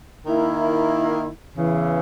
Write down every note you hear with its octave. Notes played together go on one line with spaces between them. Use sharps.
D#3 A#3 E4
E2 C#3 E3